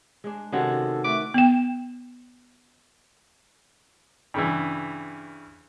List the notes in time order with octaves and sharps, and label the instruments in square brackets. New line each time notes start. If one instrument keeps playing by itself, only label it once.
[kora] G#3 D4
[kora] C3 D#3 [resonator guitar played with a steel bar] G#3 C#4 F#4 [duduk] A4
[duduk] A3 [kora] B4 [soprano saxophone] D6
[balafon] B3 G5
[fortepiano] G2 C#3 E3